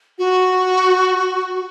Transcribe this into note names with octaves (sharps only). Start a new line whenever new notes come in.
F#4